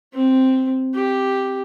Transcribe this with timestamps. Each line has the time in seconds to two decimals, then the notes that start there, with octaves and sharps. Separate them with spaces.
0.14 C4
0.94 G4